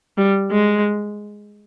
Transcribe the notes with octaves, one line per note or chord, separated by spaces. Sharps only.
G3
G#3